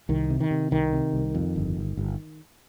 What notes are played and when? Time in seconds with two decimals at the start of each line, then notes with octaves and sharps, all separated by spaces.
0.09 C2 D#3
0.30 C3
0.40 D#3
0.51 C3
0.71 C2 D#3
0.93 C3
1.13 C2
1.35 F2
1.56 G1
1.77 G1
1.97 G1